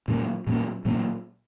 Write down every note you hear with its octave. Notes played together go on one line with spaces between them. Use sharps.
A#2 F#3 A#3 C#4
A#2 F#3 A#3 C#4
A#2 F#3 A#3 C#4